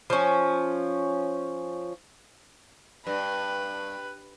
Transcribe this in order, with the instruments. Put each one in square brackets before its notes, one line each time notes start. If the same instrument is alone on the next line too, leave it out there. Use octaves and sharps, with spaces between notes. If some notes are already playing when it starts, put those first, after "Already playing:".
[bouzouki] F3 C#4
[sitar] G2 [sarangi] B4